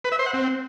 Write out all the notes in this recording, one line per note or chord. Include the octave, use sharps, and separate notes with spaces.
B4
E5
C5
F#5
C4